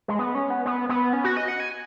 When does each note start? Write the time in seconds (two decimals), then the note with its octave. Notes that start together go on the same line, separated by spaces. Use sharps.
0.08 G#3
0.19 B3
0.35 C#4
0.50 B3
0.66 B3
0.89 B3
1.13 C#4
1.24 F#4
1.37 D#5
1.48 F#5
1.60 G#5